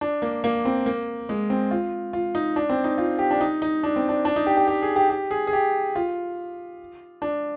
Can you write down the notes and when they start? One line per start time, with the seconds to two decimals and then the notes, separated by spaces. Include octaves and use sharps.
0.01 D4
0.22 A#3
0.44 A#3
0.65 C4
0.86 A#3
1.29 G#3
1.50 C4
1.71 F4
2.13 F4
2.35 D#4
2.56 D4
2.70 C4
2.84 D#4
2.98 F4
3.19 G4
3.31 D4
3.41 D#4
3.62 D#4
3.83 D4
3.96 C4
4.09 D4
4.25 D4
4.36 D#4
4.47 G4
4.57 G4
4.68 G4
4.82 G#4
4.96 G4
5.10 G4
5.31 G#4
5.47 G#4
5.53 G4
5.96 F4
7.22 D4